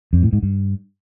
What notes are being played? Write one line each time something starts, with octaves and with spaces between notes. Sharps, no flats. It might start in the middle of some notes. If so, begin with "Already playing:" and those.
F2
A2
G#2
G2